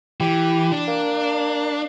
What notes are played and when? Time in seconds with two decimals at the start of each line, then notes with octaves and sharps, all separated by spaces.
0.20 E3 G4
0.72 D4
0.88 A#3